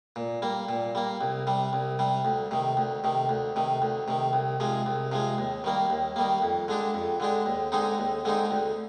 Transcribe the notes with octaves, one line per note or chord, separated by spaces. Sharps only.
A#2
G3 A#3
A#2
G3 A#3
C2
C3 G3
C2
C3 G3
D2
C3 D#3
D2
C3 D#3
D2
C3 D#3
D2
C3 D#3
C2
C3 F3 G#3
C2
C3 F3 G#3
D#2
D#3 G3 A#3
D#2
D#3 G3 A#3
F2
D3 G#3 D4 G4
F2
D3 G#3 D4 G4
D#2
D3 G#3 C4 D#4
D#2
D3 G#3 C4 D#4
D2